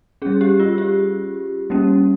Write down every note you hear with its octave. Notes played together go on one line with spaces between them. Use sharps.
G3 C#4 G#4
G4
F4
G4
G3 A#3 C#4